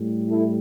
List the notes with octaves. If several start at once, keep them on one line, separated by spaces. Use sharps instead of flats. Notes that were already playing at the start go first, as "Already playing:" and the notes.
Already playing: A2 G3
E4 A4